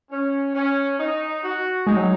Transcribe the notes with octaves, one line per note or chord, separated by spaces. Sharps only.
C#4
C#4
D#4
F#4
G#3 D#4
F#3